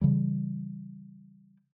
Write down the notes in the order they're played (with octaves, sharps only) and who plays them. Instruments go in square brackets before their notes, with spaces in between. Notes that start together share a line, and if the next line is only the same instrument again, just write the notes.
[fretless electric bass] C#3 E3 G3